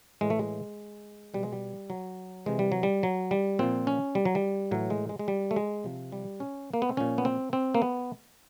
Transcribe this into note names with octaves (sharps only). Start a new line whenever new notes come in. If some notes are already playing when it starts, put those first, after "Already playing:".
A2 E3 G#3
A3
G#3
B2 G3
G#3
G3
F#3
C3 E3 G#3
G3
F#3
G3
F#3
G3
A#2 F3 C4
C#4
G3
F#3
G3
A2 E3 F#3
G#3
G#3
G#3
G3
A3
G#3
C3 F3
G3
C#4
A#3
B3
C4
A#2 F3 C#4
B3
C4
C4
A#3
B3